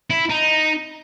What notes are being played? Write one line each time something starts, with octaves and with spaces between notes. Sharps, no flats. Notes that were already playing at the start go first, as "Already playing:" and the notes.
E4
D#4